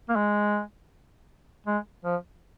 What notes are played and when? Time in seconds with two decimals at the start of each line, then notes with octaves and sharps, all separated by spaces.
0.09 A#3
0.16 G#3
1.66 G#3
2.04 F3